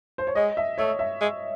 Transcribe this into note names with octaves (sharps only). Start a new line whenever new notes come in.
C5
C#5
G#3 D#5
E5
A3 C#5
E5
G#3